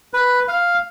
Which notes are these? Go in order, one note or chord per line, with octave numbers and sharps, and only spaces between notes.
B4
F5